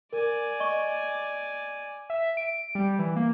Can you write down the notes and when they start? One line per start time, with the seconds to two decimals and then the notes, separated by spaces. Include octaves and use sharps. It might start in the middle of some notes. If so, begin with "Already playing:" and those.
0.13 A#4 D5 G#5
0.60 D#5 C#6 G7
2.10 E5
2.37 D7
2.75 G3
2.99 E3
3.16 A#3